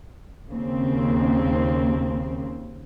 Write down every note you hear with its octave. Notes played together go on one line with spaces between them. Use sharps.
D#2 C#3 A#3 C4